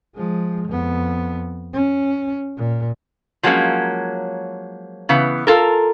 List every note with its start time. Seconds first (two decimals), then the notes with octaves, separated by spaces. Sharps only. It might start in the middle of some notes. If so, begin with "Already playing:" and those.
0.15 F3 G#3
0.68 F2 B3
1.73 C#4
2.57 A#2
3.43 F3 F#3 G#3 A#3 C#4
5.09 C#3 E3 B3
5.47 F4 A4 A#4